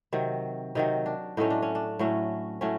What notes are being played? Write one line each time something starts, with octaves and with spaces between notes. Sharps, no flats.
C3 D#3 F#3
C3 D#3 F#3 D#4
D4
A2 F#3 A3 C#4 D#4
D4
C#4
D4
A2 F#3 A3 C#4
A2 F#3 A3 C#4